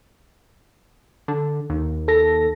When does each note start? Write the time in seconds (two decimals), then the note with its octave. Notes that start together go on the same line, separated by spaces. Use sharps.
1.28 D3
1.70 D#2
2.08 A4 A#6